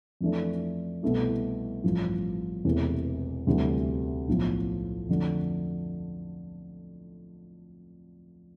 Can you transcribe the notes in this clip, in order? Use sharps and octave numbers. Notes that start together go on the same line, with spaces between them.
F2 E3 A3 D4
C2 B2 A3 E4
A1 G2 F3
E1 E2 C3 E3 A3
D2 C3 E3 G3
B1 A2 F3
F2 D3 A3